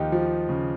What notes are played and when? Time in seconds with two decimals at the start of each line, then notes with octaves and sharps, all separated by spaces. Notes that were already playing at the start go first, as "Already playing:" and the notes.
Already playing: D#2 F3 D#4 F4 G4
0.12 F3
0.49 C#3